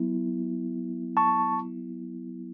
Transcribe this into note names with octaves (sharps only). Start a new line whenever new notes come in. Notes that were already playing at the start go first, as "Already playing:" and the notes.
Already playing: F#3 B3 E4
A5 C#6